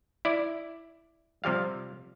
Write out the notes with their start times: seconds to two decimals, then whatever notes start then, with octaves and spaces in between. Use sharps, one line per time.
0.25 E4 D5
1.44 C3 F3 G3 F5